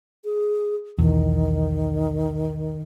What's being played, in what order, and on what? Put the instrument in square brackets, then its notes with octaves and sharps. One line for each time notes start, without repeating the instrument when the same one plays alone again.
[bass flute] G#4
[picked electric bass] B1 E2 [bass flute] D#3